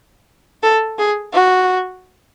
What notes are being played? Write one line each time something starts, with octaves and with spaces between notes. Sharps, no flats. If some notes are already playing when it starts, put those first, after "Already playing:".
A4
G#4
F#4